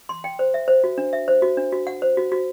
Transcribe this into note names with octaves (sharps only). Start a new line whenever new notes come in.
C6
G5
C5
E5
C5
F#4
D4
E5
C5
F#4
D4
F#4
F#5
C5
F#4
F#4